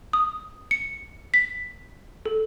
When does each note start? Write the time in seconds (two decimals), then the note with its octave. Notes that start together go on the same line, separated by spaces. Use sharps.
0.13 D#6
0.71 C#7
1.34 B6
2.26 A4